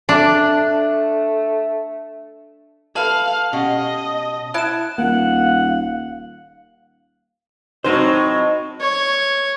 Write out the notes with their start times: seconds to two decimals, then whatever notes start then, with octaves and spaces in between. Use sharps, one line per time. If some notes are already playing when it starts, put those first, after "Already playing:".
0.09 A3 D4
2.96 A4 B4 E5 F5 A5 F#7
3.53 B2 C#4 G4 D#5 C7
4.54 E4 F#5 A5 F#6 E7
4.98 D#1 A#3 F5 F#5
7.84 A2 F#3 C4 D#4 C5 D#5
8.81 C#5